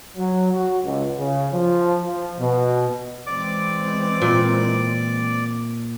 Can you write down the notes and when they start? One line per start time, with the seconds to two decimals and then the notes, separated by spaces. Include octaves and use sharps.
0.17 F#3
0.53 F#4
0.84 C#2
1.18 C#3
1.53 F3
2.04 F3
2.40 B2
3.27 E3 G#3 C4 D5 D6
4.22 A#2